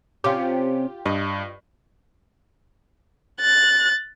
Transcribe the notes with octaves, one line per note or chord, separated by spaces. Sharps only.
C3 C#4 F4 G4
G2 D#5
F#6 A6